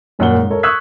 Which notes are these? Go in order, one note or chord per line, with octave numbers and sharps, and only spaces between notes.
D#1 F#2 A#2 F#5 G7
G#2
A4 A#4 C#5
C#6 D#6 E6 F#6 G#6 B6